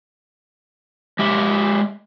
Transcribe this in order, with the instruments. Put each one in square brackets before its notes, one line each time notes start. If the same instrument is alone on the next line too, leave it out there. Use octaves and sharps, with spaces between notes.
[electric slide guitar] G#3 G4 E5